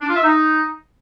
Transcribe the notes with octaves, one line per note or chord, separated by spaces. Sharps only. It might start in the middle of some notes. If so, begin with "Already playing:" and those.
D4
F4
E5
D#4